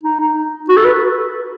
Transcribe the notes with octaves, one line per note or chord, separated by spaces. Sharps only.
D#4
D#4
F#4
A4
B4